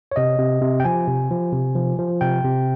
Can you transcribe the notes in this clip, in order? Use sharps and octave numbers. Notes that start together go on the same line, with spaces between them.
C#5
C3 D#5
C3
C3
G5
F3 G#5
C3
F3
C3
F3
F3
C3 G5
C3